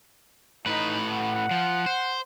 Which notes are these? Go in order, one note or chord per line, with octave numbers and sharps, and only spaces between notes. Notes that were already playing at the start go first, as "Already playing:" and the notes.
A2 D#4 B4
F#5
F3
C5